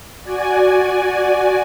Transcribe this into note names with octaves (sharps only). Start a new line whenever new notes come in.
F#4 D5 G#5